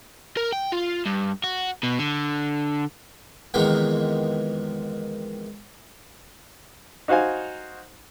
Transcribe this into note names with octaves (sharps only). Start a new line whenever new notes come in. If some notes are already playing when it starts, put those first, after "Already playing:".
A#4
G5
F4
G2
F#4
B2
D3
F2 C3 D#3 E3 G#3 B3
D#4 F#4 C5 F5 G#5